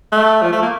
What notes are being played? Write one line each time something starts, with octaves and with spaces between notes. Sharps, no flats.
A3
F3
A3
A#3